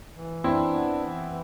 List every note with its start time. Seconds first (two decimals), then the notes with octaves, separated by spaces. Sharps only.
0.15 E3
0.43 C4 D4 E4
0.72 B3
1.01 E3